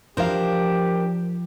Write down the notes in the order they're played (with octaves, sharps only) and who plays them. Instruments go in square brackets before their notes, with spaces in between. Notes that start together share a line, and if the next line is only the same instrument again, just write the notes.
[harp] F3 [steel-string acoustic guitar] D4 A#4 [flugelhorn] G4 [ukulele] C5 F5